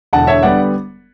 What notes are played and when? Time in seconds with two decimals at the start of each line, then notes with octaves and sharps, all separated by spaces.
0.13 E1 E2 D3 F#5 A5
0.27 C#5 E5
0.43 D3 G3 B3 D5 F#5